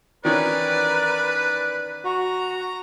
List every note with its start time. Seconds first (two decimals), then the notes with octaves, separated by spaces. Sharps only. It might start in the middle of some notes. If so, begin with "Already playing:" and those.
0.25 D#3 E3 C#4 A#4 B4 D5
2.05 F#4 A#5